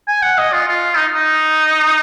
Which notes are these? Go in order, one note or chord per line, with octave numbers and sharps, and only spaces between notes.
G#5
F#5
D#5
F4
F4
D#4
D#4